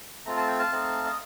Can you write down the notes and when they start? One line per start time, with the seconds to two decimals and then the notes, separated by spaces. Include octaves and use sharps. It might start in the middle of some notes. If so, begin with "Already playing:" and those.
0.26 A3 C4 F4 A#5
0.37 A5
0.48 G5
0.59 F5 A5
0.72 A3 C4 D#4
1.06 D#5